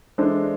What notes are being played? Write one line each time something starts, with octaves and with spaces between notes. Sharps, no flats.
E3 G#3 D4 A4 C5